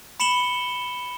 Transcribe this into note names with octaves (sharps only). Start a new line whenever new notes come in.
B5 C#7 E7 F#7 G7